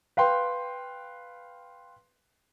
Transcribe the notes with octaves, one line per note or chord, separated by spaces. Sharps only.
B4 F5 G5 C6